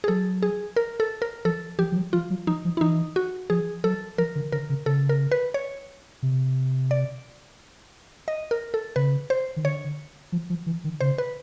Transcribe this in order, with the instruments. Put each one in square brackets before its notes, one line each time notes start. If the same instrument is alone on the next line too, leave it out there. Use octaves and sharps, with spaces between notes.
[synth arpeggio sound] G#4
[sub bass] F#3 [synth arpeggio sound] A4
[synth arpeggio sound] G#4
A#4
A4
A#4
[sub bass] F3 [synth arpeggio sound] A4
[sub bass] F3 [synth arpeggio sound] G4
[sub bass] F3
F#3
[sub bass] F3 [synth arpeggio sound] F4
[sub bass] F#3
[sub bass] F3 [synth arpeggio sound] D#4
[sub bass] F3
[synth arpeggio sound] E4
[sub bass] E3 [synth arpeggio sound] D#4
[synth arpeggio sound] F#4
[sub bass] F3 [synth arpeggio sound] G#4
[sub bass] F#3 [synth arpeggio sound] A4
[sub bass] F3 [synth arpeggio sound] A#4
[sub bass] D3
[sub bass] D3 [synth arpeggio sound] A#4
[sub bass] C#3
[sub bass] C#3 [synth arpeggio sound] A4
[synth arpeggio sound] A#4
B4
C#5
[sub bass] C3
[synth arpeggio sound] D5
D#5
A#4
A4
[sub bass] C#3 [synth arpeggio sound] B4
[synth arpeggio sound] C5
[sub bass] D#3
[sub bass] D3 [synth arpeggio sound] C#5
[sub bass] F3
F3
E3
D#3
[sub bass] C#3 [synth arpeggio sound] C5
[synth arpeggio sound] B4